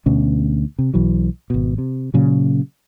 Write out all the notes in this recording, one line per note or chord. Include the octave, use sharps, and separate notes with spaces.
D2 B2 C#4
C3
B1 E3 F#3
G#1 B2
C3
A#2 C#3 F#3